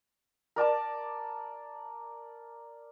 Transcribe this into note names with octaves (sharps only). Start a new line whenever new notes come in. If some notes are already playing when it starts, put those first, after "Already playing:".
A#4 D5 A5 D6